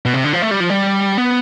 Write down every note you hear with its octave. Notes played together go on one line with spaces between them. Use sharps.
B2
C3
D3
F3
A3
G3
F3
G3
B3